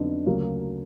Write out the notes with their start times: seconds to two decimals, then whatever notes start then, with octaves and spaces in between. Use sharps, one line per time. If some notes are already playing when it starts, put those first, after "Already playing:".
Already playing: F2 D3 F#3 B3 D#4
0.26 D2 C#3 F#3 A#3